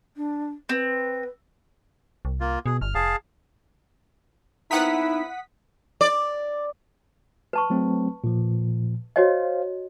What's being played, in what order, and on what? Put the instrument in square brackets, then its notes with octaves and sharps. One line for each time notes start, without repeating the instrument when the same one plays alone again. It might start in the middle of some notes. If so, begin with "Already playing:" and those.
[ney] D4
[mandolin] C4 [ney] B4
[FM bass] C2
[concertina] A#3 F4
[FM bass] B2 [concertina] G#4
[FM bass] G1 [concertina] F6
[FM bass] F1 [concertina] G#4 F5 A5
[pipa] B3 C4 A#4 [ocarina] D#4 [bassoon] E4 [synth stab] F#5 D#6 B6
[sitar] D5
[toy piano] B4 A5 C#6
[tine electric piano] F#3 A3 C4
A#2 F3
[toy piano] F#4 C#5 D#5 [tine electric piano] C5 F5